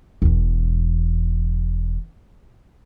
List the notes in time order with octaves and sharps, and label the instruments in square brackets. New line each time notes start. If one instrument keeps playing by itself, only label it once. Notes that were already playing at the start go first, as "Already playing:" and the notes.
[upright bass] E1 E2